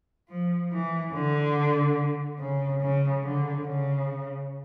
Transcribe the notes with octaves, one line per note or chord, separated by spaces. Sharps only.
F3
E3
D3
C#3
C#3
D3
C#3